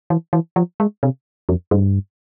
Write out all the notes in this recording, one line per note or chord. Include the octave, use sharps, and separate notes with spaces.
E3
E3
F3
G#3
C3
F2
G2